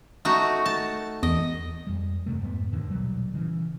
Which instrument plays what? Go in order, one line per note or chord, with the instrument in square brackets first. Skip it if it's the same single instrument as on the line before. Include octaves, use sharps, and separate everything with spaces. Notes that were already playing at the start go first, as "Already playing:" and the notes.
[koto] A3 D#4 F#4
A5
[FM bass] E2 [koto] D#5
[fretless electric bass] F2 G3
E2 G2 C3 A3
F2 G#2 G3 B3
D#2 D3 D#3
A#1 B2 F#3 G3
C#3 E3